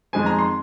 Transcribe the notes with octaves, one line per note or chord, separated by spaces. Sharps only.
F2 D#3 G#3 C4 G#5
A#5
C6